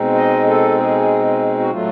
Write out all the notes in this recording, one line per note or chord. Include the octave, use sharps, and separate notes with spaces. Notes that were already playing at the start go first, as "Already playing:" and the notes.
Already playing: B2 G#3 C4 D#4
D#5
A4
G#4
F#4
A2 F#3 A3 F4